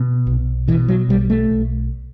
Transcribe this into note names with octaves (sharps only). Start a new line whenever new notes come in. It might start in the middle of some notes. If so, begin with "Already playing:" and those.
Already playing: B2
B1
B2 E3
F#3
B1 G3
A3
B1